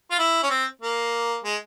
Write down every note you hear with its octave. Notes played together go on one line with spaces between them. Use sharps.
F4
E4
C#4
C4
A#3
G#3